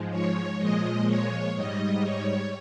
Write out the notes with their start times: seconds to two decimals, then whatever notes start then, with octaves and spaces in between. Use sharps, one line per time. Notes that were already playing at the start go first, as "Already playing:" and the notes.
Already playing: G#2 F3 G#3
0.10 C#5
0.58 A#2 F3 G#3 D#5
1.07 C#5
1.54 G#2 G3 D#5
2.02 C#5